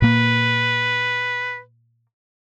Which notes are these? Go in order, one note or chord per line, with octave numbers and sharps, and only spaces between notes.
A#2 A#3 B4